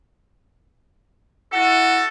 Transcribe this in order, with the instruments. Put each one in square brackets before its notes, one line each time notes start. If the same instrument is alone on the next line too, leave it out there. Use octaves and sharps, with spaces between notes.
[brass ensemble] E4 F#5 [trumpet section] F#4 A4